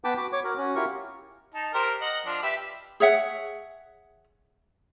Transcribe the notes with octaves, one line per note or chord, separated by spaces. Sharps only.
B3 B4 G5 A5 B5 D6
F#4 B5 D6
C#5 D6
F#4 A#4
C#4 F#4
E4 F4 G4 A#4 C#6
D#4 A5
G4 A#4 C5
D#5 F#5
F3 D4 F5
G4 B4 E5
G#4 C#5 E5 F#5